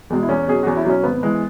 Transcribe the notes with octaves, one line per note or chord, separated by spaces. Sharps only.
E2 B2 G#3
E4
E2 C#4
B2 F#3 G#4
E2 F#4
E4
B2 F#3 C#4
G#1 B3
E3 G#3